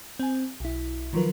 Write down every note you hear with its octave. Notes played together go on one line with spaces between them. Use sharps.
C4 G#5
B1 E4
D#3 F3 F#3 F4 A#4 B4